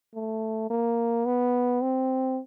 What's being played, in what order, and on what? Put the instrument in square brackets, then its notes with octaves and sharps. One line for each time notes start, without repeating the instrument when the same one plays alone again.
[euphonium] A3
A#3
B3
C4